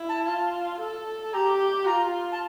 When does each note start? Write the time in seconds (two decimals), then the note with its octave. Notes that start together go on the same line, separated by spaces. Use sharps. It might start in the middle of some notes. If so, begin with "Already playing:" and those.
Already playing: E4
0.09 A5
0.27 F4
0.80 A4
1.33 G4 A#5
1.86 F4 A#5
2.32 A5